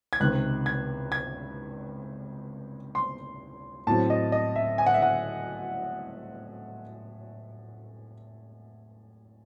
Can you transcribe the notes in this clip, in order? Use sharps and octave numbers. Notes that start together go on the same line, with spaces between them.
G#6
C#2 C3 D#3 F#6
G#6
G#6
C6
A2 F#3 C4 A5
D#5
D#5
E5
G#5
F#5
E5
F#5